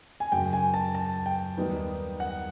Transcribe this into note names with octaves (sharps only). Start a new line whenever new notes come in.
G#5
F#2 C#3 F#3 G5
G#5
A5
A5
G5
D#2 D#3 G3 B3 D#4
F#5